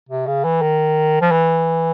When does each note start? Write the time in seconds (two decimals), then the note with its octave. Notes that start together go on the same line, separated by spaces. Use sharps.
0.09 C3
0.27 C#3
0.44 E3
0.62 D#3
1.21 F3
1.31 E3